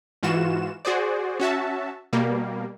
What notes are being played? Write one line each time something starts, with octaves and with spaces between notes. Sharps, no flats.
G#2 E3 F4 F#4 E7
F#4 G#4 C5 D5
C#4 F#4 E5 A5
B2 G3 A#3